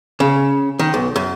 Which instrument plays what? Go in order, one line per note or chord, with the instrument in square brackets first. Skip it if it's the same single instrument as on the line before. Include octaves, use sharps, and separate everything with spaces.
[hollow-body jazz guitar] C#3
D#3
B1
F#2